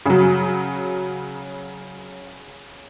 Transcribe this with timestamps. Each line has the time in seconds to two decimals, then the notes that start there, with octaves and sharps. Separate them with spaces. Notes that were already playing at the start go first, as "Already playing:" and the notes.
0.06 C#3 F#3